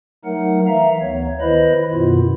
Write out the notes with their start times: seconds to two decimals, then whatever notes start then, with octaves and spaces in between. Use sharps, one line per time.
0.25 F#3 A3 D#4 A#4 F#5
0.67 E3 E5 F5 A#5
1.02 D2 B3 C#5
1.41 D#3 E4 B4 C5 D#5 B5
1.92 F#2 B2 D#3 B3 E4 F4